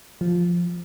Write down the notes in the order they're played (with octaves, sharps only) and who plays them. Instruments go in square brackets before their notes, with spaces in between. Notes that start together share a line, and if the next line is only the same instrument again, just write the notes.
[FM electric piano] F3